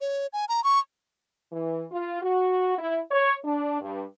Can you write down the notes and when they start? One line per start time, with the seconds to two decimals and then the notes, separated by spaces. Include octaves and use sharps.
0.01 C#5
0.33 G#5
0.49 A#5
0.64 C#6
1.52 E3
1.91 F4
2.22 F#4
2.79 E4
3.11 C#5
3.45 D4
3.81 G2